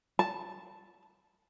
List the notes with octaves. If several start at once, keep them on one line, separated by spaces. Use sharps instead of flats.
A5